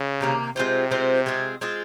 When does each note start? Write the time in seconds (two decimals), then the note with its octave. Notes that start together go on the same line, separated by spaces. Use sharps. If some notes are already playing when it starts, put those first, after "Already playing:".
Already playing: C#3
0.21 C3 D#3 A#3
0.56 C3 G#3 C4 F4 C5
0.91 G#3 C4 F4 C5
1.26 G#3 C4 F4 G#4
1.61 G#3 C4 F4 G#4